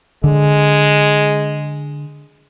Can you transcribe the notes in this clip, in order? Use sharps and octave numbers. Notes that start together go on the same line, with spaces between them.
D3 G#3